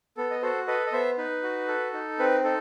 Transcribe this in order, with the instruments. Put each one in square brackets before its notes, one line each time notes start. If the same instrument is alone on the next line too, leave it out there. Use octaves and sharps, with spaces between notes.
[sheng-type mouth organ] B3 A4
D#5
F#4 A4 C5
A4 B4 D#5
D#5
B3 C5 E5
D#4 B4
F#4
A4
D#4
C4 B4
D#4 A4